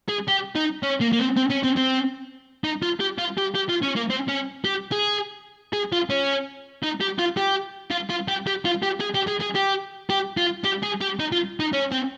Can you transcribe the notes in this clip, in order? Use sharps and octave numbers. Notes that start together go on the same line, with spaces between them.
G#4
G4
D#4
C#4
A#3
A#3
C4
C4
C#4
C4
C4
D#4
F4
G4
F4
G4
G4
F4
C#4
A#3
C4
C#4
G4
G#4
G#4
F4
C#4
D#4
G4
F4
G4
F4
F4
G4
G4
F4
G4
G#4
G4
G#4
G#4
G4
G4
F4
G4
G#4
G4
D#4
F4
D#4
C#4
C4